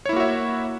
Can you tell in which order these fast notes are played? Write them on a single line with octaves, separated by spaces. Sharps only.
C#5 E4 A#3 F#4 E5